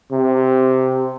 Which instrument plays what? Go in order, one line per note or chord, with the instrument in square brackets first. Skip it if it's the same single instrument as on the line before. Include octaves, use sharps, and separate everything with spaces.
[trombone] C3